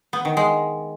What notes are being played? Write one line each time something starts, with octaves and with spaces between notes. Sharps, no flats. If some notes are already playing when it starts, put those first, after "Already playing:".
B3
D#3
G#3